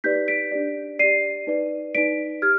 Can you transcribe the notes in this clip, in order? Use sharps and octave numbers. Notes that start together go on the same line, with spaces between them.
D#4 G4 B4 D5 G6 B6
B6 D7
D4 G4 D5
G4 D5 C7 D#7
D#4 B4 D5
D#4 B4 D5 B6 D7
G4 F6 G#6